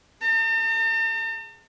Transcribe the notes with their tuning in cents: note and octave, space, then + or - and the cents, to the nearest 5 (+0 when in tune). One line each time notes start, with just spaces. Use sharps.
G#4 +0 A5 +45